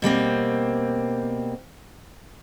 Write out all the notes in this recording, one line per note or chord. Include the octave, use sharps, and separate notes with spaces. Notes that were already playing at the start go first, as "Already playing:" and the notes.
B2 G3 A#3 C4